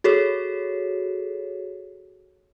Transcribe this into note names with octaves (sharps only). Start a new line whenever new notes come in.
F#4 G#4 A4 C#5